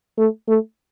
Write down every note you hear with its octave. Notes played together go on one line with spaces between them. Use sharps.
A3
A3